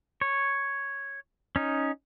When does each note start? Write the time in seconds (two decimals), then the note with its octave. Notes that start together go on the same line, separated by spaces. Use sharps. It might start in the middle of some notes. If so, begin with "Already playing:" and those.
0.21 C#5
1.56 C#4 D#4